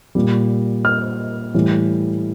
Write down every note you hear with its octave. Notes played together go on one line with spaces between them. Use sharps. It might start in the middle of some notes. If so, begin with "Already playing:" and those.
A#2 G3
F6
A2 E3 G3